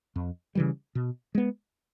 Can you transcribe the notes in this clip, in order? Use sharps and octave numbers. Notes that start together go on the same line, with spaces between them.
F2
C#3 E3 G3
B2
G#3 B3